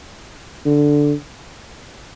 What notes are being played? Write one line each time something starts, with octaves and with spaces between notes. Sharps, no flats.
D3